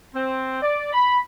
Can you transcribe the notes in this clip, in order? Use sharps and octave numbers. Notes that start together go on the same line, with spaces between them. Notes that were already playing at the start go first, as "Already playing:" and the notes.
C4
D5
B5